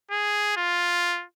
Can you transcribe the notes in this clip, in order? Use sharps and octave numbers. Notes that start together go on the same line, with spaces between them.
G#4
F4